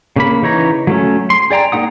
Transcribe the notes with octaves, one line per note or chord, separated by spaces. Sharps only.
C#3 A#3 B5
C#3 E3 D#4 C#5 A#5
F#3 A3 C#4
C6
G#4 D5 G5 A#5
A#3 C4 D#4 F#5 D#6